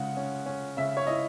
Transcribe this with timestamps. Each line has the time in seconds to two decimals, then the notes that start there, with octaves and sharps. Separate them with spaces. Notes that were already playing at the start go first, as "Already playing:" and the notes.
Already playing: C#3 G#3 F#5
0.17 C#4
0.46 C#4
0.77 C#3 E5
0.97 C#5
1.07 E4 D#5